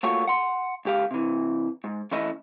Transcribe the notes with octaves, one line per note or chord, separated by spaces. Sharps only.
A3 A#3 F4 F#4 C#5
F#5 C6
C#2 G4 F5
C3 E3
G#2
E3 A3 C#4 E4 D#5